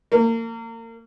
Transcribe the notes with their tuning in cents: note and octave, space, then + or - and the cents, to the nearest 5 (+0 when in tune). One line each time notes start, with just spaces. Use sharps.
A#3 -30